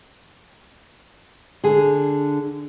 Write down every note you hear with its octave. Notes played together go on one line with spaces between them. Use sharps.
D3 G#4